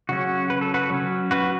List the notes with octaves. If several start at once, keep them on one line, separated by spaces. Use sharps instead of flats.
C#3 F#3 C#4 F#4
B4
A4
F#4 B4
F#3 C#4
F#4 B4